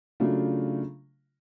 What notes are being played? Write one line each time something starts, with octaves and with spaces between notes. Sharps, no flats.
C#3 F#3 A3 D4 F4